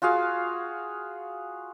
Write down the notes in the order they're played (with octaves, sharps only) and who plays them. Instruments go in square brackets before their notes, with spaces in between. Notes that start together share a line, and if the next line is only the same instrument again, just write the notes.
[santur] F4 F#4 G#4 F5